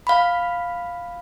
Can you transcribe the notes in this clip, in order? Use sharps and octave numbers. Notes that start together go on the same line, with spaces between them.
F5 B5